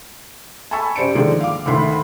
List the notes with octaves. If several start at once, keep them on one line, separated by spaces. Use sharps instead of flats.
G#5 A5 B5 C#6 E6
F#2 G4 C5 D5 C#7 D7
D3 D#3 F3 G#3 A#3 D4
F5 D6
D2 A2 D#3 E4 B5 C6